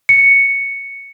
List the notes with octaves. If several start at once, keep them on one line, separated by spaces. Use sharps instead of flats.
C#7